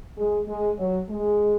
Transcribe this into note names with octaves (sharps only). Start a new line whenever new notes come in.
G#3
G#3
F#3
G#3